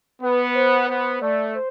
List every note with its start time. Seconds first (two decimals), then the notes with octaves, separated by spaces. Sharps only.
0.22 B3 B4
0.55 C5
0.88 B3 C5
1.22 A3 D5
1.55 C5